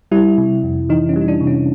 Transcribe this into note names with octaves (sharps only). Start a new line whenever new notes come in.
G3 E4
C3
F2
E3 D#4
C#4
G3
D#4
D4
C3
C#4